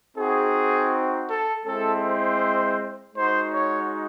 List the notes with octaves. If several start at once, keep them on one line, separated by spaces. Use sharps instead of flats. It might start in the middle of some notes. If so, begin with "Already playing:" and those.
C4 D#4 F#4 G#4
A4
G#3 C4 E4 A4
C5
G#3 D#4 F#4 C5
C#5